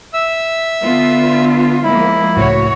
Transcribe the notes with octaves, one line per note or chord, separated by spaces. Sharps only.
E5 E6
D3 B3 F4
F3 G#3 A#3 E4
C#2 A2 F#4 C#5